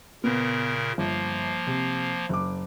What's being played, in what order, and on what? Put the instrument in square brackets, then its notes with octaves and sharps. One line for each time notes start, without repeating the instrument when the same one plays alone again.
[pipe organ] A#2 C#3 A#4 [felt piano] B3
[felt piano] G1 [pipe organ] F3 A#3
[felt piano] C3
F#1 D6